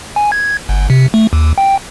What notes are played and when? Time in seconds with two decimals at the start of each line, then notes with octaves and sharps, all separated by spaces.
0.16 G#5
0.32 G#6
0.69 G1
0.90 C3
1.14 A3
1.33 D#2
1.58 G5